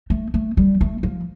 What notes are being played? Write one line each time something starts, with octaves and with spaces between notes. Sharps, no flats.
A3
A3
G3
A3
F3